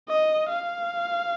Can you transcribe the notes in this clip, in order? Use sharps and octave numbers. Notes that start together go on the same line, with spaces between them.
D#5
F5